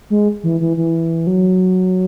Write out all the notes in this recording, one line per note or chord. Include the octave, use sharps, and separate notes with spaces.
G#3
E3
E3
E3
F#3